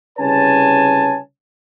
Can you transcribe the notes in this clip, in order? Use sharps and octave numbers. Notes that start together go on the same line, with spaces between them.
C2 C#3 B4 C#5 G#5 A5